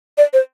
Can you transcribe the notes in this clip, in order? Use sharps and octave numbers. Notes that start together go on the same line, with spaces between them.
D5
C5